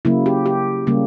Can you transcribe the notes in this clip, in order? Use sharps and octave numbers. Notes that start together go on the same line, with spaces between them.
C#3 F#3 A#3 E4
G4
G4
C#3 G3 A#3